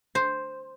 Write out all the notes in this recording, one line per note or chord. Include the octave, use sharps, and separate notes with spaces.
C5